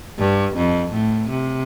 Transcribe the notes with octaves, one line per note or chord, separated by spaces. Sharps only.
G2
F2
A2
C3